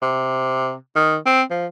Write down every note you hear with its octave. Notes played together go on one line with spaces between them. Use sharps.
C3
D#3
C4
F3